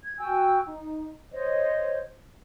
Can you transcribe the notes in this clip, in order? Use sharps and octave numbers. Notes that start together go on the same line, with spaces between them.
G#6
F#4 G5 G#5 E6
D#4
C5 C#5 D#5